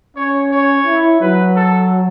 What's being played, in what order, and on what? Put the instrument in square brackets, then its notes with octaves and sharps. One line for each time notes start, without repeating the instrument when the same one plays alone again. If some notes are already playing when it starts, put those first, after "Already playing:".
[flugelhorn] C#4 [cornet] C#5
[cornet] C#5
[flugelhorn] E4
[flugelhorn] F#3 [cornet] B4
[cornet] A4